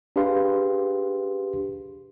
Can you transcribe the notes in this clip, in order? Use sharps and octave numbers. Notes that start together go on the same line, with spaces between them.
D4 G4 G#4 B4 F5 C6